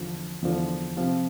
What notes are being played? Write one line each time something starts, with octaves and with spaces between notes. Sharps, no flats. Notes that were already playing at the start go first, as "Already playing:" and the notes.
Already playing: E2 D3 F3
E2 D3 F3
C3 F3 C4 F4